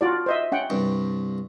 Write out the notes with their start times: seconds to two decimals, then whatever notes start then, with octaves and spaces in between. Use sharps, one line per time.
0.01 F4 F#4 D5
0.26 C5 D#5 E5
0.52 C#4 F#5 G5
0.70 C2 G2